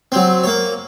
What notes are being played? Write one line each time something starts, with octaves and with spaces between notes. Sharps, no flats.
F#3 C4
A#3 C#5